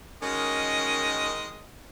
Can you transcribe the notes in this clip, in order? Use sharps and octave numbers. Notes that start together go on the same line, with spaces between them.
D#3 G#3 C#4 F#4 A#4 D#5